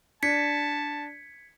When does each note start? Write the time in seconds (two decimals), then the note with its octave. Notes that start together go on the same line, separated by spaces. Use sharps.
0.23 D4 A5 G#6 B6 C#7